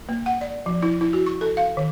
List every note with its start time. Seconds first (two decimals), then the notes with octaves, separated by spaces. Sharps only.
0.09 A#3
0.26 F#5
0.41 D5
0.66 F3
0.83 E4
1.01 E4
1.13 F#4
1.26 C#6
1.41 A4
1.57 F5
1.77 D#3